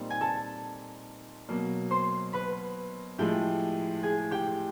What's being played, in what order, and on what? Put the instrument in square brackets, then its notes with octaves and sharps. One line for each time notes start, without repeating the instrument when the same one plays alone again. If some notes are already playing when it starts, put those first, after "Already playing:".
Already playing: [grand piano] A#2 G3 C4 D#4
[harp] G#5
A4 A5
[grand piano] B2 F#3 A#3
[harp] C5 C6
B4 B5
[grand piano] A2 F3 G#3 [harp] G4 G5
[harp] G#4 G#5
G4 G5